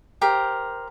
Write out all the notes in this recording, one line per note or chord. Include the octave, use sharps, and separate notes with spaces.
G4 A#4 C5